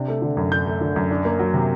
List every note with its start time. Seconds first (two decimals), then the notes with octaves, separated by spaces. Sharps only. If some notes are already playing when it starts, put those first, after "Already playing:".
Already playing: C3 D4
0.08 A3
0.22 D3
0.37 F#2
0.52 D4 G6
0.66 A3
0.81 D3
0.96 F#2
1.11 D4
1.25 A#3
1.39 F#3
1.54 C3